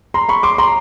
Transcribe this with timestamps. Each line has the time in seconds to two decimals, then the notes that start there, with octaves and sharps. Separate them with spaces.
0.14 A#5 C6
0.29 B5 C#6
0.43 C6 D6
0.58 A#5 C6